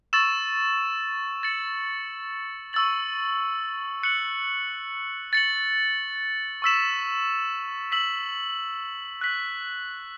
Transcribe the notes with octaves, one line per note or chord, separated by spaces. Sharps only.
C#6 E6 A6 E7
A6 C#7 F#7
C#6 E6 A6 F#7
F#6 C#7 F#7
A6 C#7 F#7
C#6 E6 B6 E7
E6 B6 F#7
F#6 B6 F#7